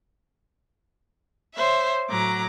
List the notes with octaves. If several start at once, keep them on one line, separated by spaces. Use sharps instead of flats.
C5 C#5 E5
A2 F#3 A#5 D6